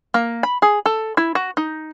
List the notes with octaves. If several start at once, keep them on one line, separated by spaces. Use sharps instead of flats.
A#3
B5
G#4
A4
E4
F#4
D#4